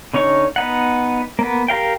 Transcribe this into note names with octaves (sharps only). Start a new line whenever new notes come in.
D3 C#4 D#4 C#5 C#6
B3 D#4 F#5
A#3 B3
G4 A#4 F5 G5